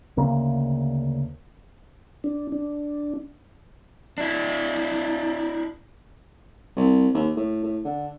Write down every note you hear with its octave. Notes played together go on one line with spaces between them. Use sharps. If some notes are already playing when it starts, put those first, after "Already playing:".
D2 C#3 A#3
D4
D4
D4 E4
C2
D#2
A2
A2
D3